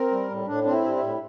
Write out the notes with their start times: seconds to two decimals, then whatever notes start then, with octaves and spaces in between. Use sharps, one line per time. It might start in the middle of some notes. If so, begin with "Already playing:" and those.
Already playing: C4 A#4
0.11 G3
0.29 A2
0.47 A2 D4
0.64 C4 D4
0.72 E4
0.84 G3
0.96 E4
1.02 A2